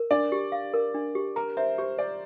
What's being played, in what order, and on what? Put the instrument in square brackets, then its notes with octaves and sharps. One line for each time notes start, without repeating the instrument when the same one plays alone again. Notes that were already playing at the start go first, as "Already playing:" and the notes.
Already playing: [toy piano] A#4
[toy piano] D4 [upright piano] D5
[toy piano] G4
F5
A#4
D4
G4
[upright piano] A#4 [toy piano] A#5
[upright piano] C5 [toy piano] E5
[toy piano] G4 [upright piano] C5
[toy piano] C5 [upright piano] D5